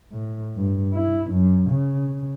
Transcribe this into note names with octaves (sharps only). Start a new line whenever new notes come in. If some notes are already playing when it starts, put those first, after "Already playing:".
A2
G2
E4
F#2
C#3